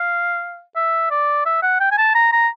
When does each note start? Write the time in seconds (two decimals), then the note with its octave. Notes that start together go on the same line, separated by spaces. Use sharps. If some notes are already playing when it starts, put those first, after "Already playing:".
Already playing: F5
0.76 E5
1.10 D5
1.46 E5
1.62 F#5
1.80 G5
1.92 G#5
1.98 A5
2.14 A#5
2.32 A#5